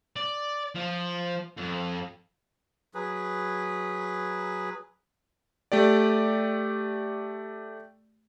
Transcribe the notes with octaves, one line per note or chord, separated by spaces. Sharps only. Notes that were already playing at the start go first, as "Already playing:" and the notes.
D5
F3
F2
F#3 G#4 B4
A3 G4 D5